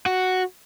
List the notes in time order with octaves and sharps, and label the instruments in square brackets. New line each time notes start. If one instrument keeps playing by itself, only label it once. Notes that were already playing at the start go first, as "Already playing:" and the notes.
[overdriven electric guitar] F#4